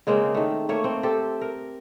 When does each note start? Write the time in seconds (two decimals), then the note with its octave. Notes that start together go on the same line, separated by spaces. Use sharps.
0.07 C#3 G#3 A#3 C4
0.34 D#3 A3
0.69 A3 A#3 C#5
0.84 C4
1.03 G4 A4 C5
1.41 A#4